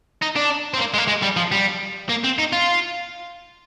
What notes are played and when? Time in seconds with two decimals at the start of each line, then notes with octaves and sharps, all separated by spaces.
0.22 D#4
0.36 D4
0.74 C4
0.79 A#3
0.94 G#3
0.98 A#3
1.08 G#3
1.23 G3
1.37 F3
1.52 G3
2.09 A#3
2.24 C4
2.38 D#4
2.52 F4